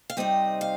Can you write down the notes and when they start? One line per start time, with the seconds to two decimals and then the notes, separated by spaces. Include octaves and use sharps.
0.10 F5
0.17 C3 G3 C4 D#4 D#5
0.61 F5